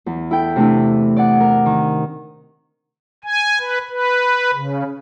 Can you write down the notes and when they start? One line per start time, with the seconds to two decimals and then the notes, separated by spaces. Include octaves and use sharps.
0.06 E2
0.31 E4 A4 G5
0.56 C3 A3 D4 E4
1.17 D5 F#5
1.40 A#4
1.66 D#3
3.24 G#5
3.59 B4
3.89 B4
4.54 C#3